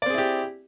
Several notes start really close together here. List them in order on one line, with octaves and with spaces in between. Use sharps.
D5 C4 G#4 E4 G4